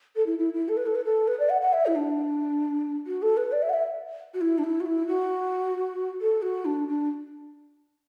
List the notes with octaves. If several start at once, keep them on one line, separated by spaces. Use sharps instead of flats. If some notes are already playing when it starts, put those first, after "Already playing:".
A4
E4
E4
E4
A4
B4
A4
B4
A4
B4
D5
F#5
F#5
E5
E4
D4
F#4
A4
B4
D5
E5
F#5
E5
F#4
E4
D4
E4
F#4
E4
F#4
A4
F#4
D4
D4